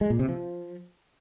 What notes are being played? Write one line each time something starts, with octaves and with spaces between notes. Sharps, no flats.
G#3
A#2
C3
F3